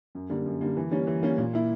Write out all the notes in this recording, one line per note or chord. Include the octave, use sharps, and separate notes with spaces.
F#2
D3 G3 A#3
F#2
D3 G3 A#3
E3
G3 A#3 C#4
E3
G3 A#3 C#4
A#2
A#3 E4